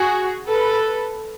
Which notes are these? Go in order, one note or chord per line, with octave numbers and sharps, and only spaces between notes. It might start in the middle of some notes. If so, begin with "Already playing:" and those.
Already playing: F#4 G#4
A4 B4